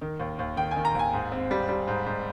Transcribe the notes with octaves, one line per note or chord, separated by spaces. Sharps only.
D#3
D#2
D#2
D#3 G5
G#5
D#3
A#5
D#2 G#5
G#2
C4
G3
G3
G#2
G#2